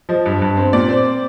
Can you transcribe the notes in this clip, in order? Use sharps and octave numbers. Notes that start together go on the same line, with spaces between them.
F3 D#5
G2
G2
C4
A#2 D5
C4